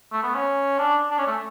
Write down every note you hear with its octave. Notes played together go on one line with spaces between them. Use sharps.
A3
B3
C#4
D4
D4
C#4
A3